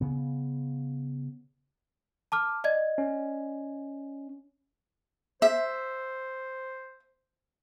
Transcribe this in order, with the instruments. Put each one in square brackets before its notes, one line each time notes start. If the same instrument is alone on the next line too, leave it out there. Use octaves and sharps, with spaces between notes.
[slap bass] C#3 B3
[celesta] A5 D6 F6
D5 D#5 G#6
[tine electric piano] C#4
[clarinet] C5 [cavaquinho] E5